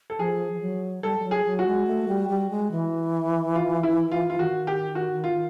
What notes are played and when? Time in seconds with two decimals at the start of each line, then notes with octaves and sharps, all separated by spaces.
0.10 A4
0.19 F3 G#4
0.53 F3
0.61 F#3
1.03 G3 A4
1.20 G3
1.24 F#3
1.31 G#4
1.45 F#3
1.59 F#4
1.66 G#3
1.87 A3
2.08 G3
2.29 G3
2.50 G#3
2.71 E3
3.55 F4
3.83 E4
4.11 F4
4.30 F4
4.39 D#3 F#4
4.67 G4
4.95 F#4
5.24 F4